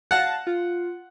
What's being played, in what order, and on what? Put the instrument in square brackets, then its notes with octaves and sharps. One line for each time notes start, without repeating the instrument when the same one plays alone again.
[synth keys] F5 A5 A#6 [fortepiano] F#5
[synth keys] F4